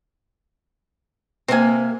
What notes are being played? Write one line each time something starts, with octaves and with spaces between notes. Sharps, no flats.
C3 A#3 C4 G#5